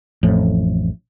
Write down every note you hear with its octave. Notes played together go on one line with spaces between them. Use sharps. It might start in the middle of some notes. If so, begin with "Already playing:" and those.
A1 F2 A2